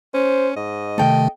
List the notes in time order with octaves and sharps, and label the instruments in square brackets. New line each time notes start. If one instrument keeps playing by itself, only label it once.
[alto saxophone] C#4 [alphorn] C5
[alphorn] G#2 [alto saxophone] D#5
[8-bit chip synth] C3 D#3 A3 [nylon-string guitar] A4 G5